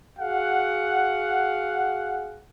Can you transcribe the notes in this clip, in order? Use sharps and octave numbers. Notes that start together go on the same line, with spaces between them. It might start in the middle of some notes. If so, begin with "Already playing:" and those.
F#4 G#4 F5 F#5